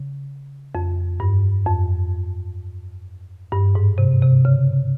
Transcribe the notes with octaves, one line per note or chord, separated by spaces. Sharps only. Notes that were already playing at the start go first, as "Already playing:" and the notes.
Already playing: C#3
F2
G2
F2
G2
G#2
C3
C3
C#3